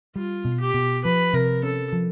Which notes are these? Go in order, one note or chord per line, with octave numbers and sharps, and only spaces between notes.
G3 F4
B2
G4
B2
F3 B4
C3 A#4
C#4 A4
F3